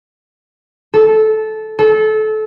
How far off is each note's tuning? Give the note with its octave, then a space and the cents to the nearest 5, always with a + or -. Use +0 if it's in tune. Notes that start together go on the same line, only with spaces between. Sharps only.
A4 -15
A4 -25